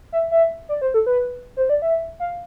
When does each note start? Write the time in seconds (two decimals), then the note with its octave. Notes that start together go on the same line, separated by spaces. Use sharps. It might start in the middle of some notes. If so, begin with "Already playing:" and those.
0.12 E5
0.31 E5
0.69 D5
0.81 C5
0.94 A4
1.06 B4
1.57 C5
1.69 D5
1.82 E5
2.20 F5